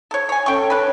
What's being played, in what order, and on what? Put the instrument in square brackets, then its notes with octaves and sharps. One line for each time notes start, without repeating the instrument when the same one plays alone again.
[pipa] A4 C#5
C#5 G#5
[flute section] C#4 A4 [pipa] G5 C#6
[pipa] D4 B4 [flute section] C#5